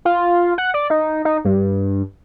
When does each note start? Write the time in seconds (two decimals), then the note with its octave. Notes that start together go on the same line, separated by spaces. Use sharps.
0.05 F4
0.58 F#5
0.74 D5
0.90 D#4
1.25 D#4
1.45 G2